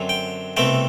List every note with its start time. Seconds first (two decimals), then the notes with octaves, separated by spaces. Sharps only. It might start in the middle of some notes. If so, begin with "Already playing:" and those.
Already playing: F#2 D3 F#3 C4
0.09 G5
0.57 C2 B2 A3 C4 G5